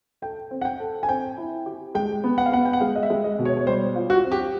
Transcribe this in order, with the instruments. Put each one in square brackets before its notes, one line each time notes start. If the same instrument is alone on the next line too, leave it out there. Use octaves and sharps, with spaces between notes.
[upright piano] A4 [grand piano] G5
[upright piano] C4
[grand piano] F#5
G5
[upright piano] A4
[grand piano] G#5
[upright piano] C4 [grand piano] G5
[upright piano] E4
G4
[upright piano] G#3 [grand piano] G5
[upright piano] B3
[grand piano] F#5
F5
[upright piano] B3 [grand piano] F#5
[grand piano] G5
F#5
[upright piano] G#3 [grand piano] F5
[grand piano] D#5
E5
[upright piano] G#3
[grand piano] D#5
[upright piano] B2
[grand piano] C#5
C#5
[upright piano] G3 [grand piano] C5
[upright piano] F4
[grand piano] F#4
[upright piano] C4
[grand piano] G4